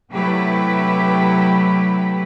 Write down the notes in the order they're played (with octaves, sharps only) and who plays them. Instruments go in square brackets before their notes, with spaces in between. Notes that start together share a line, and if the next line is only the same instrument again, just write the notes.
[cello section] C3 F#3 A3 E4 G4 B4